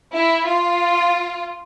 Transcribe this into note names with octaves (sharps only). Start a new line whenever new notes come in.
E4
F4